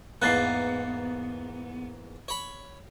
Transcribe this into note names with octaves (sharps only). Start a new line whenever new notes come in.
E2 G#2 A#3 B3 F#6 A6 C7
C#5 B5